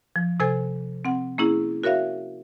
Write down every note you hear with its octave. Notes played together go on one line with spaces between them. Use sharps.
F3
C3 A4 C5 G#5 G#6
C4 F#5
A#3 C#4 E4 G#4
F#4 A#4 C#5 E5 F5